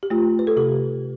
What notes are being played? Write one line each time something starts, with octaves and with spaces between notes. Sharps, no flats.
G4
A3 F4
B4
A4
C3 G4